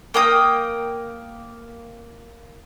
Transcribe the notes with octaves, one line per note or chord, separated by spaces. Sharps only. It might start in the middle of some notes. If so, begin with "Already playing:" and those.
A#3 G5 D#6